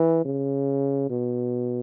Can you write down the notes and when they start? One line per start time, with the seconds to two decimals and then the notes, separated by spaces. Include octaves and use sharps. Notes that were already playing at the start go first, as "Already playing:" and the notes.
Already playing: E3
0.25 C#3
1.10 B2